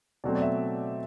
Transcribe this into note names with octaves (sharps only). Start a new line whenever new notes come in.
B2 F#3 A3 C4 D5
D5
E5